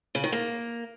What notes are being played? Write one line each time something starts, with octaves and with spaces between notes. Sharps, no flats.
C#3
D#3
A#3